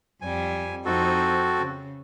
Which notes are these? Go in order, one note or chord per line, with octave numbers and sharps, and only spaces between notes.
F2 G3 G#5
F2 F3 C4 D#4 F#4 A4
C#3